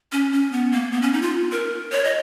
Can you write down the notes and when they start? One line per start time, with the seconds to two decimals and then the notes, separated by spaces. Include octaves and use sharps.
0.12 C#4
0.32 C#4
0.52 B3
0.72 A#3
0.91 B3
1.02 C#4
1.13 D#4
1.22 F4
1.52 A#4
1.92 C#5
2.04 D#5